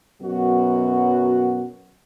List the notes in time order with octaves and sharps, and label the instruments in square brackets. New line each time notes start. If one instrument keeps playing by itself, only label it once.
[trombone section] F#2 B2 F#3 F#4